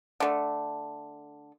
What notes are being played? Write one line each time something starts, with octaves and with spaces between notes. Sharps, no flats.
D3 A3